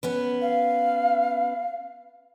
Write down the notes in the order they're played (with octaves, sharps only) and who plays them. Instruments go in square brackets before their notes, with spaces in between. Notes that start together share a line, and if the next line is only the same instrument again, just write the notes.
[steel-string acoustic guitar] B3 C#4 B4
[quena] F5